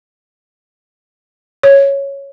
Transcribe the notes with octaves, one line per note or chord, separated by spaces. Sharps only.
C#5